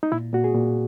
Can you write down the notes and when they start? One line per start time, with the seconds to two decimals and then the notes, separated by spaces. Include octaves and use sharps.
0.03 D#4
0.12 A#2 E4
0.33 A#2 F#4
0.44 G#4
0.54 A#2